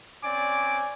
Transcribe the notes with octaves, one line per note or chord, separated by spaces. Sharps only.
C4 C#4 D5 G#5 D6